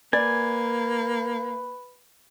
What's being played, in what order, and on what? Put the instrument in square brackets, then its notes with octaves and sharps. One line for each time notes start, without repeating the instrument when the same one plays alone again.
[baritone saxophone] A#3 [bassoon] B4 [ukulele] D5 [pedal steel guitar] G#5